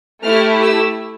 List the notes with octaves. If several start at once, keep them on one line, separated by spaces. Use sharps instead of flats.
A3 E4 G4 F6
E6